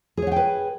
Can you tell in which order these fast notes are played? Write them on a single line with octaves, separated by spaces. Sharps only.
G#4 C#5 F#5 G5 B4